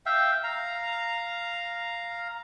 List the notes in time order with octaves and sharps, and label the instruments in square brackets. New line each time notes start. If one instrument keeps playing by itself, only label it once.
[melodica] E5 F5 G5
F5 A#5